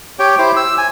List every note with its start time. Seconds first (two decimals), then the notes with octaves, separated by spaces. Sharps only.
0.19 G4 C#5 G5
0.38 E4 G4 C5
0.56 E6
0.78 G#5